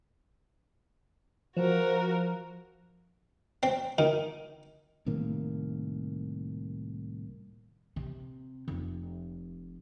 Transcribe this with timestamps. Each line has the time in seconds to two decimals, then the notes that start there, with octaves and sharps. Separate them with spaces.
1.57 F3 F#4 A#4
3.63 C4
3.98 D#3
5.06 C2 A2 D#3 A#3
7.96 C3
8.68 F1